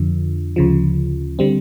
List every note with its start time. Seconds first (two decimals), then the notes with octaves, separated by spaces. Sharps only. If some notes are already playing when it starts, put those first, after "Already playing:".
Already playing: F2 D3 F3
0.56 D2 C#3 F3
1.39 D3 G3 C4